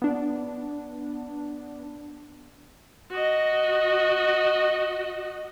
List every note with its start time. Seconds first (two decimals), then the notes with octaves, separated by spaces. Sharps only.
0.02 B3 D4
3.11 F#4 D#5